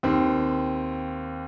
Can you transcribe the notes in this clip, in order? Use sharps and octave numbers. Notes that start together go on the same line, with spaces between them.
D#2 C4